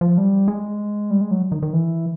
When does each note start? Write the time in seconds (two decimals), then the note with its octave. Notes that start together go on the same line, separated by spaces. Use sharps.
0.01 F3
0.18 G3
0.48 G#3
1.10 G3
1.21 G#3
1.31 F#3
1.52 D#3
1.63 D#3
1.73 E3